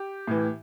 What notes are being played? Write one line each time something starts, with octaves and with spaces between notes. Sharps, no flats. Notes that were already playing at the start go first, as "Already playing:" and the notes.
Already playing: G4
A2 E3